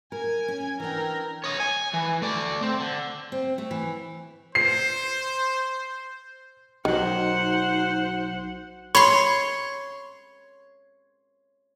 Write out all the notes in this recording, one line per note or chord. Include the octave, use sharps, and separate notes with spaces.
A#4 G#5 G#6
C#4
E3 D4 A#4 G5
C#5 D#5
G#5
E3
A3 D5
C4
D3
C4
A3
E3
C5 C7
B1 D#3 F#3 D#4 C5 F#5
C#5 B5 C6